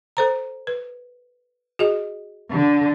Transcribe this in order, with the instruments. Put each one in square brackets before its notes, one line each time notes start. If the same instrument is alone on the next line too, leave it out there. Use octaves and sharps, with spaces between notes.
[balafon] A4 C5 A#5
B4
F#4 G#4 D#5
[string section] D3